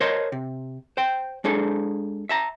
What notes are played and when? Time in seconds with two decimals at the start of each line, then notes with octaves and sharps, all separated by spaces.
0.01 A#4 C5 C#5 D#5 A5 C6
0.32 C3
0.97 C5 G5
1.44 G#3 D4 G#4 A4
2.29 E5 A5 A#5